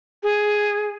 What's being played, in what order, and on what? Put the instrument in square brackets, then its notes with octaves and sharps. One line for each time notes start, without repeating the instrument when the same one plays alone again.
[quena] G#4